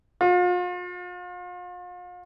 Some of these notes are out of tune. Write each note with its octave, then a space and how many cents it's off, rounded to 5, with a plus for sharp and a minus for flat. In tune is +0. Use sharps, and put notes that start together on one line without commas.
F4 +40